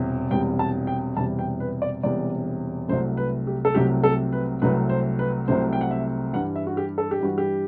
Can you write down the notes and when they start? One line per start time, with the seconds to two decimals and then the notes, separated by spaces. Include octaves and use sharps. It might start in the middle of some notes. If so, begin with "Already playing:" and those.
Already playing: E1 E2 C3 G3
0.30 E1 E2 C3 G3 G5
0.59 A5
0.87 G5
1.17 E1 E2 C3 G3 A5
1.39 G5
1.60 B4
1.82 D5
2.03 E1 E2 C3 G3 D5
2.88 C2 C3 F#3 A3 C5
3.17 B4
3.47 G4
3.65 A4
3.75 C2 C3 F#3 A3 G4
4.04 A4
4.32 B4
4.62 C2 C3 F#3 A3 B4
4.89 C5
5.19 B4
5.48 C2 C3 F#3 A3 C5
5.73 G5
5.81 F#5
5.91 E5
6.33 G2 E3 G3 F#5
6.56 E5
6.67 F#4
6.77 G4
6.98 A4
7.11 G4
7.20 G2 E3 G3 F#4
7.38 G4